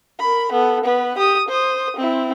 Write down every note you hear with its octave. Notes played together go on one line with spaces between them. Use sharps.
A#4 B5
B3 A4
B3 B4
G4 D#6
C5 D#6
C4 E4